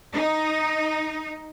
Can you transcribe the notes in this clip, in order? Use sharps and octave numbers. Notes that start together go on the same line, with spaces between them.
D#4